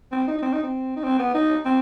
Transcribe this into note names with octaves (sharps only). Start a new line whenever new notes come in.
C4
D#4
D#4
C4
D#4
C4
D#4
C4
B3
D#4
C4